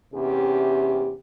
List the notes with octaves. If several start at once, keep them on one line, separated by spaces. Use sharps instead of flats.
E2 C3 C#4 G4